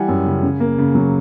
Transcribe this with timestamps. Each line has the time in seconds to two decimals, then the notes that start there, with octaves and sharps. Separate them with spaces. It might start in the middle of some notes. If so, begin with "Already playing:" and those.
Already playing: E3 G3 F#5 G#5
0.08 F#2
0.26 C#3
0.43 C#3
0.60 A#3
0.78 C#3
0.95 F#3